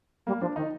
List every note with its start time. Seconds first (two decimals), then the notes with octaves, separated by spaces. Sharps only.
0.27 G3 A#3
0.41 F3 D4
0.56 D#3 D#4